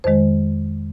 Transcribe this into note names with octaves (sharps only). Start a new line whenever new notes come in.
F2 D#3 G#3 C5